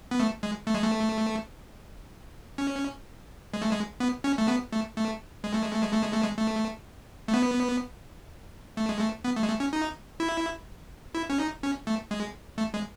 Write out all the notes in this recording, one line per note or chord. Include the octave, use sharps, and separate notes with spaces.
B3
A3
G#3
A3
G#3
A3
C#4
G#3
A3
G#3
B3
C#4
A3
B3
A3
A3
G#3
A3
G#3
A3
G#3
A3
G#3
A3
G#3
A3
A3
B3
A3
G#3
A3
B3
A3
G#3
A3
C#4
D#4
E4
E4
C#4
D#4
C#4
A3
G#3
A3
G#3